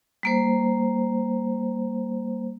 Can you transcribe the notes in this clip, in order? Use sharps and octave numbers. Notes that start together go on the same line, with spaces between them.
G3 A#3 C5